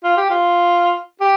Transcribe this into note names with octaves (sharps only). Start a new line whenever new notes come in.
F4
G4
F4
G4